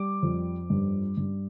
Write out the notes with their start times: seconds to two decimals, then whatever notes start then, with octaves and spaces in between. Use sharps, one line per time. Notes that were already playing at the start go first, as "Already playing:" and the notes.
Already playing: G3 D6
0.23 F2
0.70 G2
1.17 G2